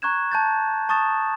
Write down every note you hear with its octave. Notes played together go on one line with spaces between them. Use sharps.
A#5 C#6 F#6 G#6 E7
A5 G6 A6
A5 C#6 D#6 A6 E7